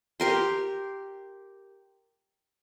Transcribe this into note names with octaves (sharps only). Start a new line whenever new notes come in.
G4 A#4 C6